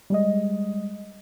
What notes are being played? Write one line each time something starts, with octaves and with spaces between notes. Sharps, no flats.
G3 G#3 D#5